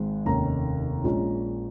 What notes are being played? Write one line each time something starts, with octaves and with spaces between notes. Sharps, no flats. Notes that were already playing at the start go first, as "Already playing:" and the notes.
Already playing: G#1 G#2 G#3
F1 D#2 D#3 A#3 C#4 A#5
A#1 A#2 G#3 C#4